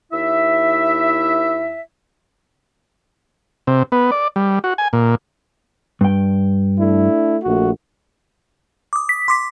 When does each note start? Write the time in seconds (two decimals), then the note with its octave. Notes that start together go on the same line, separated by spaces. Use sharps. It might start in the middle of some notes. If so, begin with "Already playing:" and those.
0.12 D#2 E4 E5
3.67 C3
3.92 B3
4.12 D5
4.36 G3
4.64 F#4
4.78 G#5
4.93 A#2
6.01 G2 G5
6.79 A3 D4 E4
7.43 A#1 A3 F#4
8.93 D6 D#6
9.09 B6
9.28 C6 D6 B6